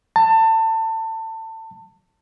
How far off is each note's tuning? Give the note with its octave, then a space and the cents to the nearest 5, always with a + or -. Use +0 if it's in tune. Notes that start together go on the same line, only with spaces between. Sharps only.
A5 +25